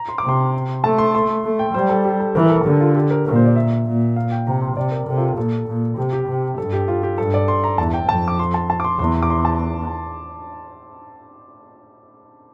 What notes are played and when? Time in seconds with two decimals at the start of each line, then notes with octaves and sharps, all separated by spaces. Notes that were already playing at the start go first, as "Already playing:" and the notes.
Already playing: A#5
0.09 C6
0.18 D6
0.24 C3
0.29 C6
0.84 A3 A5
0.98 C6
1.15 C6
1.44 A3
1.59 G5
1.74 G3 C5
1.89 A4
2.05 G4
2.20 A4
2.35 E3 A#4
2.46 A#4
2.50 A4
2.65 D3 G4
2.81 F4
2.95 G4
3.11 A#4
3.26 A#2 A#4
3.36 C5
3.45 D5
3.56 E5
3.86 A#2
4.16 F5
4.32 G5
4.47 C3 A#5
4.62 C6
4.76 C3 D5
4.92 A#4
5.07 C3 A4
5.18 F4
5.22 G4
5.37 A#2 A4
5.67 A#2
5.98 C3 G4
6.13 G4
6.28 C3
6.58 G2 A4
6.73 G4
6.88 F4
7.03 G4
7.18 G2 A4
7.34 D5
7.48 C6
7.64 A#5
7.78 E2 A5
7.94 G5
8.09 F2 A5
8.28 D6
8.39 C6
8.54 A5
8.70 A5
8.80 D6
8.84 C6
8.99 E2 C6
9.15 C6
9.23 D6
9.30 C6
9.45 A5